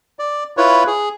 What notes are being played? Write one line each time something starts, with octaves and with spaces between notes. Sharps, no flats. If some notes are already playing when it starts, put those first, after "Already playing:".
D5
E4 F4 B4 C#5
G#4